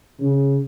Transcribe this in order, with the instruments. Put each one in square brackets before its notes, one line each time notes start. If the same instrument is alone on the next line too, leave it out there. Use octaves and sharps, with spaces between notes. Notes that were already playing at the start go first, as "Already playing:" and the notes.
[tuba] C#3